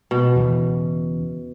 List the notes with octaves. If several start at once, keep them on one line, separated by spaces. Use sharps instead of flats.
B2
E2 C#3 E3